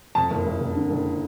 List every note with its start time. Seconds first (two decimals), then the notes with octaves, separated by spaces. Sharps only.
0.15 F2 A5
0.30 F#1
0.46 F#1
0.60 F#1
0.76 D3
0.90 F#1